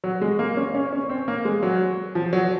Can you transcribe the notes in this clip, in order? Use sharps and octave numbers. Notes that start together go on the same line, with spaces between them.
F#3
G#3
A#3
C#4
C#4
C#4
C4
A#3
G#3
F#3
F3
F#3